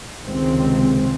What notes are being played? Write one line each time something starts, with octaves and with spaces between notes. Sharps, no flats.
C#2 C3 D#3 G#3 C4